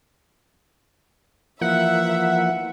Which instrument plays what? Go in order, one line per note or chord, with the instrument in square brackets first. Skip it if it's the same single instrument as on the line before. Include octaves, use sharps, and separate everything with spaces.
[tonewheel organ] E3 F3 A#3 [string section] E5 [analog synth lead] F#5